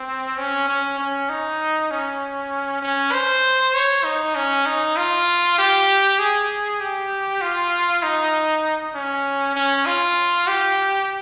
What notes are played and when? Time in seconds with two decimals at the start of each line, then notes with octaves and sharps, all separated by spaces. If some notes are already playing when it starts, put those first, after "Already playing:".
Already playing: C4
0.37 C#4
0.68 C#4
0.98 C#4
1.29 D#4
1.91 C#4
2.82 C#4
3.12 C5
3.74 C#5
4.04 D#4
4.35 C#4
4.66 D#4
4.97 F4
5.58 G4
6.19 G#4
6.80 G4
7.41 F4
8.03 D#4
8.94 C#4
9.56 C#4
9.86 F4
10.47 G4